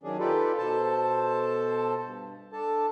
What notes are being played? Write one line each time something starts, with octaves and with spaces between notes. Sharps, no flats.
D#3 F#3 C#4 D4 G#4
D#4 F4 G4 A4 B4 D5
B2 A4 C5 A5
G2
D4 A4 A5